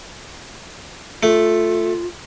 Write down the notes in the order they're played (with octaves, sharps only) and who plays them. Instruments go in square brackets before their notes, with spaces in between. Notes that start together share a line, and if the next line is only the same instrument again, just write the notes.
[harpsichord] A3 [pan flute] F4